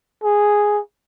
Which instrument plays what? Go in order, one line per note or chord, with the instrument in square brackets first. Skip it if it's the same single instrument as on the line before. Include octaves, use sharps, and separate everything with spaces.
[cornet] G#4